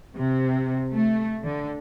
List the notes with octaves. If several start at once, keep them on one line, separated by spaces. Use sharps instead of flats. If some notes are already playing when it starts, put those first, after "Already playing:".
C3
A3
D3